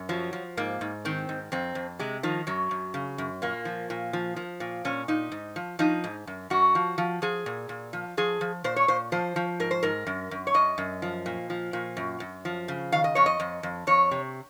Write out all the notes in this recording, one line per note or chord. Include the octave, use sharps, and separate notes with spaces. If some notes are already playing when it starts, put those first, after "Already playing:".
Already playing: F#2
F3 F#3
F3
G#2 A#3
G#2
D#3 C4
G#2
F2 C4
F2
C3 G#3
D#3 F3
F#2 F#3
F#2
C#3
F#2
A#2 A#3
F3
A#2
F3
F3
A#2
A#2 C#4
A#2 D#4
G#2
F3
F3 D#4
G#2
F#2
F#2 F#4
F3
F3
F3 G#4
A#2
A#2
F3
F3 G#4
F3
A#2 C5
C#5
A#2 C5
F3 C5
F3
G#2 A#4
C5
G#2 A#4
F#2
F#2
C#5
F#2 D#5
F#2
F3
A#2
F3
A#2
F#2
F#2
F3
C#3
D#3 F5
D#5
F2 C#5
D#5
F2
F2
F2 C#5
C3